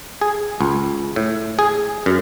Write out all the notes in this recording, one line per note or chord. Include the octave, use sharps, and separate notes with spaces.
G#4
C#2
A2
G#4
F#2